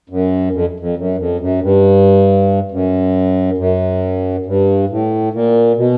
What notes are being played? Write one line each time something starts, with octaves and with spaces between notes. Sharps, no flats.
F#2
F2
F2
F#2
F2
F#2
G2
F#2
F#2
G2
A2
A#2
B2